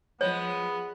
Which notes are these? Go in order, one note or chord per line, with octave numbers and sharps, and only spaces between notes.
F3 G#3 B3 C#5